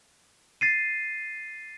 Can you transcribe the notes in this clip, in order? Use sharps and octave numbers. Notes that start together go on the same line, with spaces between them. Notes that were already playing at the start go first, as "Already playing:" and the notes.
A6 C7 D#7